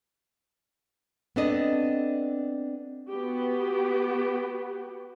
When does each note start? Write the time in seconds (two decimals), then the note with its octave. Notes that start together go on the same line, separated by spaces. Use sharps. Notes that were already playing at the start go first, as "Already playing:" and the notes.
1.36 B3 C4 D4 A4 D#5
3.09 B3 F#4 G4